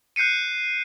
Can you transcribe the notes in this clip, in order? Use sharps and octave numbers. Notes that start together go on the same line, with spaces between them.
F#6 G6 C7 C#7 D#7